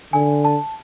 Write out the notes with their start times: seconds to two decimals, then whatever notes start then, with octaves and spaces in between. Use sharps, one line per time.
0.13 D3 G#5
0.45 A5